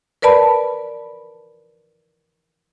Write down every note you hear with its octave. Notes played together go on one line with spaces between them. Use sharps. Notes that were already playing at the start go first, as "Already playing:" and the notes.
A#4 B4 D5 A5 B5